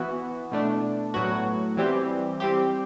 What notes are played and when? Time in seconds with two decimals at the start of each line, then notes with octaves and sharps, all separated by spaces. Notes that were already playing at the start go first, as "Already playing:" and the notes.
Already playing: E3 B3 F#4
0.51 B2 A3 D4
1.14 A2 F#3 B3 F#4
1.77 E3 G3 C4 G4
2.40 G3 C4 G4